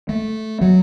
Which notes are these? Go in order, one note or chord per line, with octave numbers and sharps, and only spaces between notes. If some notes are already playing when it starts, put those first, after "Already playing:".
A3
F#3